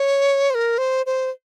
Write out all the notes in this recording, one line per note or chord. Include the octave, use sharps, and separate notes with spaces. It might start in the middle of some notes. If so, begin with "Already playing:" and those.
Already playing: C#5
C5
A#4
C5
C5